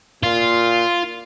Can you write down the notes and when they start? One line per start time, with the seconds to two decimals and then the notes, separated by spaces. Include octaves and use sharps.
0.23 A#2 F4